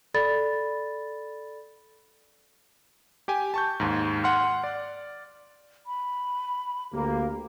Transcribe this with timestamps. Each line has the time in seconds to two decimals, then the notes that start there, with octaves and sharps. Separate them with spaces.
0.14 A4 D5 B5 A6
3.28 G4 G5 G#5
3.54 A5 C#6 G6
3.80 D#2 G#2
4.24 F#5 C6 F6
4.63 D5
5.86 B5
6.93 D2 A#3 G4